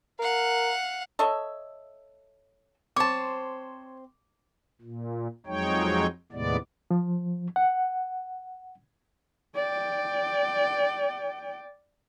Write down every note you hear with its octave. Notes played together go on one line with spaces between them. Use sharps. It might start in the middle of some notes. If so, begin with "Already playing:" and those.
A#4 F5 F#5
A4 C#5 D#5 E5
C4 C5 C#5 A5 D6
A#2
F2 F#3 G#3 D#4 C#5 G5
D#2 A2 C3 G#3 B3 D5
F3
F#5
D5 G5